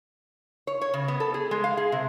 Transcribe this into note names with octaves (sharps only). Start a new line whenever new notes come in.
C#5
C#5
C#3
B3
A4
G#4
G#3
F5
G#4
C3